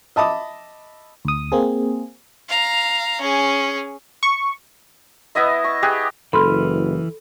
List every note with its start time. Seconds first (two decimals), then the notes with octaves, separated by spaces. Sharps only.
0.16 D#5 E5 A5 B5 D6 D#6
1.25 D2 D#6
1.52 A#3 C4 G#4
2.49 F5 A#5
3.21 C#4 G#4
4.23 C#6
5.35 B3 E4 D#5 E5
5.64 C#6
5.83 G4 G#4 F#5
6.33 F#1 E3 A4 B4 B5 C6 F6